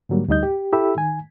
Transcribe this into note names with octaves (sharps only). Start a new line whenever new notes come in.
G#2 D3 F#3 G3 A#3
D2 G3 D#4 D#5 G6
G4
E4 G4 A4 E5 B5 E6
D#3 G#5